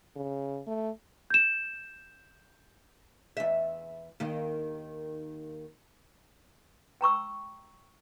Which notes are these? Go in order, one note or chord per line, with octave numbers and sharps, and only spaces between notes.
C#3
A3
G6 E7
E2 E5
D#2 D#3
G5 A#5 C#6 E6